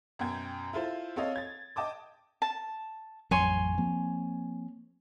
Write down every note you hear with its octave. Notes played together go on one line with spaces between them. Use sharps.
F#2 B2 G5 G#6
E4 F4 A4 C5
C4 A4 C#5 D#5 F5
G#6 A6
D#5 G5 A5 D6 D#6
A5
A1 F2 F#3 C#5 G#5 C6
F3 A#3 C4